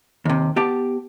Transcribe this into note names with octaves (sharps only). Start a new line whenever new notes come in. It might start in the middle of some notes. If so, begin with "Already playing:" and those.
D#2 C3
B3 G4 G5 A5